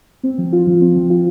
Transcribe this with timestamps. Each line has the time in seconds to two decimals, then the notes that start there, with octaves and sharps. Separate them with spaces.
0.23 C4
0.38 F3
0.53 F4
0.67 F3
0.81 C4
0.96 F3
1.10 F4